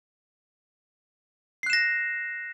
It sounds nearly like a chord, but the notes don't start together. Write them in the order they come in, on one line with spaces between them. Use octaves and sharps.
C7 F#6 E7 A#6